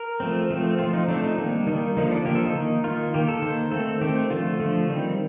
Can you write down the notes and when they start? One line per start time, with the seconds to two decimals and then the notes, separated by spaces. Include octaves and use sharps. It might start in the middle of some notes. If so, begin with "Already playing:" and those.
Already playing: A#4
0.20 F3 A3 C4
0.50 F3 A3 C4
0.79 F3 A3 C4 F4
0.94 D#4
1.08 F3 A3 C4 D4
1.23 D#4
1.38 D#3 G3 A#3 D4
1.67 D#3 G3 A#3 D#4
1.97 D3 F3 A#3 D#4
2.11 D4
2.25 D3 F3 A#3 G4
2.35 A4
2.46 D#4
2.55 D#3 A#3
2.84 D#3 A#3 F4
3.14 D#3 A#3 G4
3.28 A4
3.42 D#3 A#3 C5
3.71 D#3 A3 C4 A4
4.01 D#3 A3 C4 G4
4.30 D3 F3 A3 F4
4.60 D3 F3 A3
4.89 D#3 G3 C4